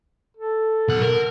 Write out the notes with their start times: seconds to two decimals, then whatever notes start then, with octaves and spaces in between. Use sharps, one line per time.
0.37 A4
0.88 B1 F#5
1.02 A#4